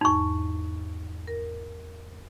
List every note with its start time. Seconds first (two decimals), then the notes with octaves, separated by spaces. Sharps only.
0.01 E2 G#2 D#4 C#6
1.28 A#4